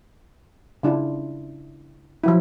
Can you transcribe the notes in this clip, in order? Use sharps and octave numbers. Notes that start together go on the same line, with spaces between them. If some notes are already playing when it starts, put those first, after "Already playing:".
C#3 D4 E4 F4
F3 F#3 E4